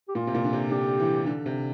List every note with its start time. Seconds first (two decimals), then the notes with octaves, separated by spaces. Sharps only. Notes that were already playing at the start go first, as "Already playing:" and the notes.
0.08 G4
0.15 A#2 F4
0.27 C3
0.35 A#2
0.44 D3
0.53 C3
0.71 D3 G4
1.00 E3
1.26 D3
1.46 C3